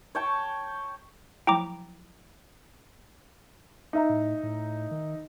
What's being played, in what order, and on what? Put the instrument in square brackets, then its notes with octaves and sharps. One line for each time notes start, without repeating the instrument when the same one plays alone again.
[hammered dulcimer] C#5 G5 A5 C#6
[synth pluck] F3 F#3 E4 [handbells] G5 A#5 D6
[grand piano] D#4 E5 A#5
[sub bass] A2
A2
D#3